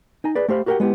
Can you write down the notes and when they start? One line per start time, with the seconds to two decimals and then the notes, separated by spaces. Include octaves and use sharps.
0.24 D#4 G#5 A#5
0.35 G#4 B4 D5
0.48 A3 G4 C5 F5 B5
0.66 F#4 G4 A#4 E5 F#5 G5
0.80 G#3 B3 E4 G4